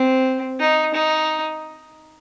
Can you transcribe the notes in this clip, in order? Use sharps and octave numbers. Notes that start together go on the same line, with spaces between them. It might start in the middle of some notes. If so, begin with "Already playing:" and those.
Already playing: C4
D#4
D#4